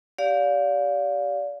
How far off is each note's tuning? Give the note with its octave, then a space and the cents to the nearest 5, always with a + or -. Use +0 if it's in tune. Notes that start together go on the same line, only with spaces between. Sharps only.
G4 -5 D5 -30 F5 +20